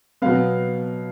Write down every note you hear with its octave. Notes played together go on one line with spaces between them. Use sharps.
B2 F#3 B3 F5